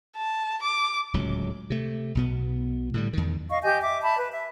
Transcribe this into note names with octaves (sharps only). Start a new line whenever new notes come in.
A5
D6
D1 C#2 F#3
C3 A3
B1 B2 B3
A2 D3 G3
E2 D#3
D#5 F5 C#6
G4 D#5 G#5 G6
E5 D6
E5 A5 B5
B4
E5